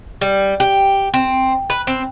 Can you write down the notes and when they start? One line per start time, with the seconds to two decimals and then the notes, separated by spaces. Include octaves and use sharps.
0.21 G3
0.60 G4
1.14 C4
1.70 B4
1.87 C4